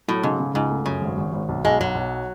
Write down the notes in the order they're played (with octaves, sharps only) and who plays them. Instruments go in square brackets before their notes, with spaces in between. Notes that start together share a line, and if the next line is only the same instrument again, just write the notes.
[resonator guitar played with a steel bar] A2 [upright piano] F#3
[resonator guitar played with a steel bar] G#2 [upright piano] C#3
[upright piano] C#3
[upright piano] C#2 [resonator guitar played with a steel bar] G#2
[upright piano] A3
[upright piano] F#2 [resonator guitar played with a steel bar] C#3
[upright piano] G#1
G#1
G#1
B1
[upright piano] B1 [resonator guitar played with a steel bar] G#3
[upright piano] B1 [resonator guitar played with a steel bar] F#3
[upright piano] B1